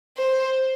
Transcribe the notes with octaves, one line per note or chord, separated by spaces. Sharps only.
C5